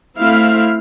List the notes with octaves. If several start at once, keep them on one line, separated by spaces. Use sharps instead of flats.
A3 C4 E4 F5